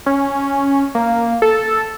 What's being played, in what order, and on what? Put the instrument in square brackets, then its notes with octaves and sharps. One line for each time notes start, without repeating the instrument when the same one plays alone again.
[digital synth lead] C#4
A#3
A4